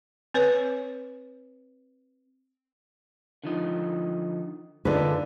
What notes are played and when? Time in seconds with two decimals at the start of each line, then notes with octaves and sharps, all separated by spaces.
0.34 C4 B4 C#5
3.44 D3 F3 D#4
4.85 D3 D#4 F4 G#4 B4